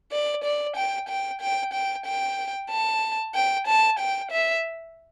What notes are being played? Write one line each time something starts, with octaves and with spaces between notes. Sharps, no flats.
D5
D5
G5
G5
G5
G5
G5
A5
G5
A5
G5
E5